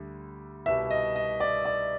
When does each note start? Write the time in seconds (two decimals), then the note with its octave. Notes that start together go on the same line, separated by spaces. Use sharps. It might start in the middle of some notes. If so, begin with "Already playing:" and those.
Already playing: D2 D3 G3
0.66 C2 B2 G3 E5
0.90 D#5
1.16 D#5
1.40 D5
1.65 D5